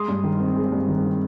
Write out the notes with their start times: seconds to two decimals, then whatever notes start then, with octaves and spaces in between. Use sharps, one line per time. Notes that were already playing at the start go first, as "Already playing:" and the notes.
Already playing: G#3 C6 D#6
0.08 G2
0.24 D#3
0.40 C4
0.55 G#3
0.72 G2
0.88 D#3
1.04 C4